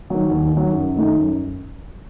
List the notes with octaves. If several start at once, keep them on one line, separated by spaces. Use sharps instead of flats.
D#3 F#3
D#2
D#3 F#3
F#2
D#3 A3 D#4
F#2